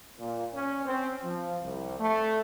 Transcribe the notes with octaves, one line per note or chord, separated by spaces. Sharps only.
A#2
C#4
C4
F3
C2
A3